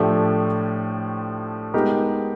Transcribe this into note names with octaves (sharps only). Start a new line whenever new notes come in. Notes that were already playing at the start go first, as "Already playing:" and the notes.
Already playing: A2 F3 A3 D4 G4
G#3 B3 D#4 G4 A#4